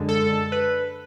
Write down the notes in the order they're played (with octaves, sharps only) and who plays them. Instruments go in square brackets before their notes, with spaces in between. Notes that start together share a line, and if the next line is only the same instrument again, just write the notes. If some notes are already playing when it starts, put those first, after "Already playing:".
Already playing: [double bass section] F#2 D3 G#3
[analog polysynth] A4
B4